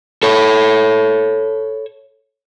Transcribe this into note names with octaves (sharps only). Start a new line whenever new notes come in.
A4 C#5